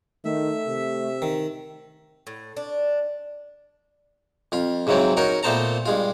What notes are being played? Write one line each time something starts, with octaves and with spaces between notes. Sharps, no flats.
D#3 A3 E5
C3
D#3
A2
D4
F2 F4
G#2 C#3 E3 F#3 C4
C#4 D#4 F#4 A#4
A#2 A3 B3 C5 A5 A#5
G2 G#3 F4